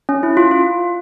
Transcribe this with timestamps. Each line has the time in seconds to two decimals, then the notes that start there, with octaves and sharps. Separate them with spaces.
0.09 C#4
0.23 E4
0.37 F4
0.51 F4